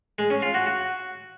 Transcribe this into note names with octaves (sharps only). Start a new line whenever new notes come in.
G#3
C#4
F4
F#4
F#4